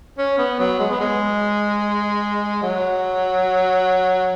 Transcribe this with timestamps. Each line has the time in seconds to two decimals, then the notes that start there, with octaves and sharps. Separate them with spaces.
0.18 C#4
0.38 B3
0.59 F#3
0.79 G#3
0.90 B3
1.00 G#3
2.62 F#3